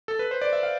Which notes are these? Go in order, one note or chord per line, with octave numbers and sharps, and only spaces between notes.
A4
B4
C5
D5
E5
F5